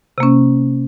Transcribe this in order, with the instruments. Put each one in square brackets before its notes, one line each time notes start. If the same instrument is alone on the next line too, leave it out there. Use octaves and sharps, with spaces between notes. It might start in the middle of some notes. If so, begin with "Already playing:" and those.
[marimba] C3
A#3
C#4